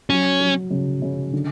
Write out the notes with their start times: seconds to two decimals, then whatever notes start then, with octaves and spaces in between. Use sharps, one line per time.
0.09 F#3 C#4
0.40 F#3
0.71 C#3
1.02 C#3
1.33 D3